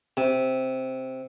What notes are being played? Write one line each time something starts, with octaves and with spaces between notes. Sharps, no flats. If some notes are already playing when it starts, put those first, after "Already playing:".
C3